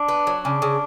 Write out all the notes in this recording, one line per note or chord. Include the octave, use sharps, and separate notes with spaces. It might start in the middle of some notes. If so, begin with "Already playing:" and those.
Already playing: D4
B3
F#3
C#3 D4
C#3